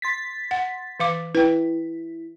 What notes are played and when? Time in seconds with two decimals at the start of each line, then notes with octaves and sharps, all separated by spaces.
0.02 C6 A6 B6
0.51 F#5
1.00 E3 F5 D6
1.35 E4 B4 G5